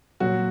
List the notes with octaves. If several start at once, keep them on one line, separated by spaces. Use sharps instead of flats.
A#2 F#3 F#4